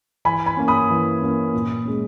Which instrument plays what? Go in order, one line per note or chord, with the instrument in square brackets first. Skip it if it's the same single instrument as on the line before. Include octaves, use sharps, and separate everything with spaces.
[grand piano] E3 G#5 B5
G#5 B5
A#3 C#4
B5 D#6
E3
A#3 C#4
A#2
G#3 C#4